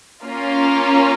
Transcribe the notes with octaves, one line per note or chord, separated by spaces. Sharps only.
A#3 C#4 F4